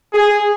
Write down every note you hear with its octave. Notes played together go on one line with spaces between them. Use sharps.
G#4